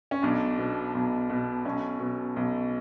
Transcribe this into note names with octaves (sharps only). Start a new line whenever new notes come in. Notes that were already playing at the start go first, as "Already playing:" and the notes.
C#4
B1 D4
B2
B1
B2
B1 C#4
B2
B1